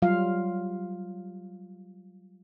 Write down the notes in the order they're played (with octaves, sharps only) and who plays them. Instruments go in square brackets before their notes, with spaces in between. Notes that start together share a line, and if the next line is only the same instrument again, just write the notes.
[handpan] F#3 G3 F4 F5